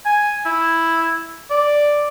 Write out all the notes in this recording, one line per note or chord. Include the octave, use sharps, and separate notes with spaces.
G#5
E4
D5